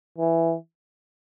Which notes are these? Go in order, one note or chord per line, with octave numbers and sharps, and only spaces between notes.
E3